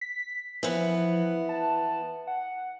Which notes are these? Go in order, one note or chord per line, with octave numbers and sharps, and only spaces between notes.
B6
E3 F3 B3
A5
F#5